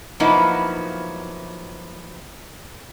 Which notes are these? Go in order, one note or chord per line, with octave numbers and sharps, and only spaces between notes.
F3 F#3 A#3 B3 D#4 E4